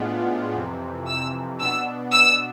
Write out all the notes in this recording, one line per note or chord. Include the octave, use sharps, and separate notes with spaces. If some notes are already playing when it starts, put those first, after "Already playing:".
Already playing: A2 G#3 B3 D4 F4
F2 C3 E3
E6
B2 B3 D4 E6
E6